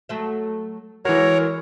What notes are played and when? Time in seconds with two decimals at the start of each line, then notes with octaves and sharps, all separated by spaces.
0.09 F#3 A3 E5
1.05 E3 G#3 F#4 A#4 C#5 A#5